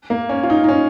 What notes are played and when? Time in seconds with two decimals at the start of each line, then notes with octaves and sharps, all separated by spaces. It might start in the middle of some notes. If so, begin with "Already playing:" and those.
0.10 A#3
0.29 C#4
0.43 F4
0.50 D#4
0.64 D#4
0.69 C#4